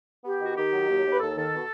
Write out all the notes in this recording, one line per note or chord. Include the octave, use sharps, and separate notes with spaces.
B3 G4
D#3 F#4
D#3 G4
F#3
D#2
D#2
B4
D#2 A4
D#3 A4
B2